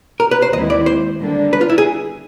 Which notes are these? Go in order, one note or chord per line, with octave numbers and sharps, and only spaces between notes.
A#4
B4
C5
D#2 D#3 G#3 C4 E4 D#5
D5
C5
D3 G3 A#3 D4
B4
F4
E4
G#4